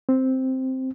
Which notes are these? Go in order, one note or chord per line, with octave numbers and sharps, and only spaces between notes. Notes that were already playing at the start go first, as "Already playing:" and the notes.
C4